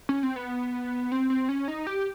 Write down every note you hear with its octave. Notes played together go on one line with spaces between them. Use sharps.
C#4
C4
B3
C4
C4
C#4
D#4
G4